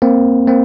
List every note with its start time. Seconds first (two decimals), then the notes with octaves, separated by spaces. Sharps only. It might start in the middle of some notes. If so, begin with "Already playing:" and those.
0.02 A#3 C4
0.48 A#3 C4